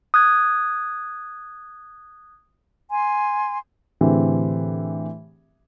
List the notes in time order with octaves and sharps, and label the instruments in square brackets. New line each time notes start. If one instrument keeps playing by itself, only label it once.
[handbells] D#6 F#6 G#6
[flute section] G#5 C6
[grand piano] A2 D3 E3 C4 G4 G#4